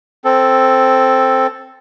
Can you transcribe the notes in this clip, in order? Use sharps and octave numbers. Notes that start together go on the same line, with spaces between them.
C4 A4